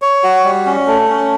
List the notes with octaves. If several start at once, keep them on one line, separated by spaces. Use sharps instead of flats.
C#5
F#4
G3
C#4
A3
C#4